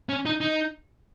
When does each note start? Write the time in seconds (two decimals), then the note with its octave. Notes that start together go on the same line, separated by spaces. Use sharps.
0.09 C#4
0.26 D#4
0.41 D#4